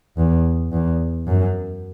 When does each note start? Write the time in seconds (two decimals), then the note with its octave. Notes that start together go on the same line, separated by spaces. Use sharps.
0.17 E2
0.72 E2
1.27 F#2